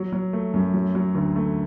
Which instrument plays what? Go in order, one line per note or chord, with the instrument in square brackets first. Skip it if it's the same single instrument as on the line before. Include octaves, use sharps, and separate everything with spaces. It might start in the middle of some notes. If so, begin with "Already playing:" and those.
Already playing: [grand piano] F#3
F#3
A3
F#2
F#3
F#3
D2
A3